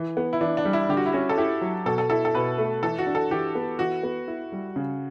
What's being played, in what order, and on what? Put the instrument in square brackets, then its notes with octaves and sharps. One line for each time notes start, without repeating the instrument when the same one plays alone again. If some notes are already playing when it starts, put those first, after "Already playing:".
Already playing: [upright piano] E3
B3
[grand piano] E4
[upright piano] E3 [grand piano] D4
[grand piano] D4
[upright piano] G3
[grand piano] E4
[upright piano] D3 [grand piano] G4
[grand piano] F#4
E4
[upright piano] C#4 [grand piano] F#4
[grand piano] A4
[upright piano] E4 [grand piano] G4
[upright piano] F#3
[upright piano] B2 [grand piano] A4
[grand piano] A4
[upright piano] E4 [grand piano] A4
[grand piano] A4
[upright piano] B2 [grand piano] B4
[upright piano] A3
[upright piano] E3 [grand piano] A4
[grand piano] F#4
[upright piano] D4
[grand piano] A4
[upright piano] E3 [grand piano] G4
[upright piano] B3
[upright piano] E3 [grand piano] F#4
[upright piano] B3
E4
G3
C#3